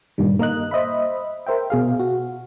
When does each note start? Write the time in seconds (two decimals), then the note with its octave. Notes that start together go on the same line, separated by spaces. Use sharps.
0.18 G2 A#2 D#3 G3
0.39 A#3 A#4 D#5 F#6
0.71 C5 D#5 E5 B5
1.47 A#4 C5 E5 G5
1.70 B2 G#4 F5
2.00 F#4